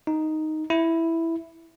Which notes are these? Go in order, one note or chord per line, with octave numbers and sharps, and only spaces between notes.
D#4
E4